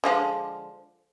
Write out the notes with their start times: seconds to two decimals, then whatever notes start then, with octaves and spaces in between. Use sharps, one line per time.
0.04 D3 F3 G#3